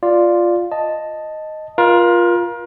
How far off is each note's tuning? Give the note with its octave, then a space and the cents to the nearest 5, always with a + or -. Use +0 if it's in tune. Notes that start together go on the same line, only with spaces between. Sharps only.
F4 +0 D5 +0
D#5 +0 A5 +0
F4 +0 A#4 +35 F5 +0